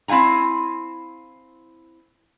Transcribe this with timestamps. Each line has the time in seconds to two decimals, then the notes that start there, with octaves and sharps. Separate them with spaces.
0.08 C4 E4 F5 G#5 A#5